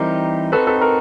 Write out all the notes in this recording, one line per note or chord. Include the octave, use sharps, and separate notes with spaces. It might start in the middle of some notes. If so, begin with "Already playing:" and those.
Already playing: E3 G3 C4 D#4 G4 A#4
C4 D#4 F#4 A4 B4
A4 B4
A#4